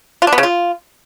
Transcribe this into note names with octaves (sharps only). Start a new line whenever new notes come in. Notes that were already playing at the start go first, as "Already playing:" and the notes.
F4
D4
B3
C#3
F4